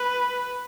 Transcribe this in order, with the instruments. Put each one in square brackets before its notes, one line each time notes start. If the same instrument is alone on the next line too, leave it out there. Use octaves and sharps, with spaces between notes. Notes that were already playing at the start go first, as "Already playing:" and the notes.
Already playing: [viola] B4